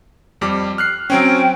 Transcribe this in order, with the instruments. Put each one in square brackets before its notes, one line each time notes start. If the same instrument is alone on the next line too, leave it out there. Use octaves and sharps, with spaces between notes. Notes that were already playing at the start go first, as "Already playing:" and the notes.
[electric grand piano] F2 G3 D6
F6 F#6 C7
[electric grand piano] F#3 C4 C#4 [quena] G5